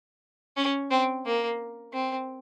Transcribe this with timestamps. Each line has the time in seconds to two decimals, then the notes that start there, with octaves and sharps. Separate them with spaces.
0.57 C#4
0.91 C4
1.26 A#3
1.93 C4